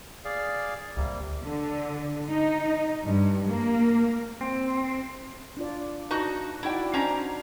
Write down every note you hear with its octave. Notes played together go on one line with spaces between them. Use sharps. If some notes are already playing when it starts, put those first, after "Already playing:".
G#4 D5 F5
D2 G#2 C3 G3 A#3
D3
D#4
G2
A#3
C4
D4 F4 D5
D#4 F#4 B4
D#4 E4 F#4 D5 G5
C#4 D4 C5 A#5